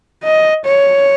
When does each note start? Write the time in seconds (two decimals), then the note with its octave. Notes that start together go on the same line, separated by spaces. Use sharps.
0.24 D#5
0.65 C#5